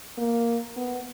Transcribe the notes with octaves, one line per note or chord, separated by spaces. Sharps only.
A#3
B3